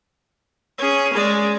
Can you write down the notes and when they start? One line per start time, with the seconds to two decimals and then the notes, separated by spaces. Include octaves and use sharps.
0.78 C#4 G#4
1.13 G#3 D5